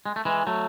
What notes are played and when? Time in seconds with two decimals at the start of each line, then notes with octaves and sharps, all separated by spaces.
0.06 G#3
0.16 A3
0.25 E3 G#3
0.47 F#3 A3